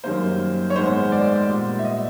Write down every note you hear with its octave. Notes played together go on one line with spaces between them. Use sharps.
F#2 D#3 G3 A#3 C5
C#5
G#2 D#3 G#3 B3 C5
D5
A#2 G3 B3
E5
D#5